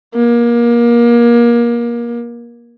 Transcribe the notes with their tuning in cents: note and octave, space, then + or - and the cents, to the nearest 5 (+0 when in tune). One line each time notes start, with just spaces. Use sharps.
A#3 +25